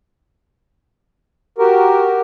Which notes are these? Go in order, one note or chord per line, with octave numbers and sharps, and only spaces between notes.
F#4 G4 A#4